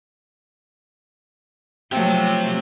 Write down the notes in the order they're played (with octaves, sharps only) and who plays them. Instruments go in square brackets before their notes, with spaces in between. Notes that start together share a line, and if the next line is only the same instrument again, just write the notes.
[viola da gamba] F3 F#3 A3 [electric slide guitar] C4 G4